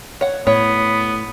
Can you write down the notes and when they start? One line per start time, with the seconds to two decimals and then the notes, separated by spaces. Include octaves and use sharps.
0.21 C#5 F#5
0.47 A2 B3 C#5